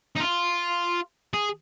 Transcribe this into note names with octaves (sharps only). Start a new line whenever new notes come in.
D#4
F4
G#4